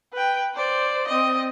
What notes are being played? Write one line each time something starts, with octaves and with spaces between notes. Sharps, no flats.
B4 G5
C5 D5
C4 D#5